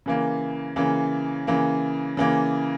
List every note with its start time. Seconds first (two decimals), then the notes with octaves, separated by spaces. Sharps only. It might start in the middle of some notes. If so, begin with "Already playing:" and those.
0.06 C#3 E3 A#3
0.76 C#3 E3 A#3
1.47 C#3 E3 A#3
2.17 C#3 E3 A#3